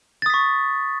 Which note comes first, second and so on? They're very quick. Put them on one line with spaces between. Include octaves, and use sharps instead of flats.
A6 D#6 B6 C#6